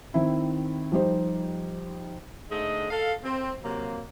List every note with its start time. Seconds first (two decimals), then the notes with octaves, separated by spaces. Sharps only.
0.14 D#3 C4 E4
0.92 F3 G3 D#4 C5
2.51 G#2 D3 G#3 A3 D#5
2.91 A4 F5
3.24 C4
3.64 C3 F#3 A#3